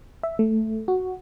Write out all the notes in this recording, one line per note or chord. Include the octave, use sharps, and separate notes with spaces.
E5
A3
F#4